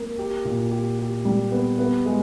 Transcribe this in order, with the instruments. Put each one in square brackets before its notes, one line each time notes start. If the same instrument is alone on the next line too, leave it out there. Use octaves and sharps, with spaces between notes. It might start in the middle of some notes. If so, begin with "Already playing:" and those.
Already playing: [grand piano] A#3
G4
A#2
G4
G4
G3
B3
B3
G#3